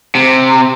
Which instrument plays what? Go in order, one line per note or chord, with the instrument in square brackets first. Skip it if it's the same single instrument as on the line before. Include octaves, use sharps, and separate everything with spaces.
[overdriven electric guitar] C3